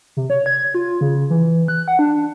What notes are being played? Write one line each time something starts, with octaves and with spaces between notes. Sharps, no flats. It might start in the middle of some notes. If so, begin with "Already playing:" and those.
C3
C#5
G#6
F4
C#3
E3
F#6
F#5
D4